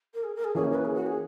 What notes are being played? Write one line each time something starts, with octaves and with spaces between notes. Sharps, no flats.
A#4
G#4
A#4
G#4
E3 A#3 C#4 G#4
D#4
A#4
B4
G#4
F#4
G#4